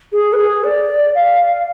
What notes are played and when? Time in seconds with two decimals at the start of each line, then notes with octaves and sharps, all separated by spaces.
0.12 G#4
0.33 B4
0.37 G#4
0.63 D5
1.15 F5